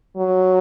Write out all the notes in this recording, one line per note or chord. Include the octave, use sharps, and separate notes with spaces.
F#3